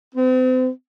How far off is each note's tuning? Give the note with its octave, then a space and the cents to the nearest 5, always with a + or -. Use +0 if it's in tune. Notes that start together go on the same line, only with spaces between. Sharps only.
C4 -40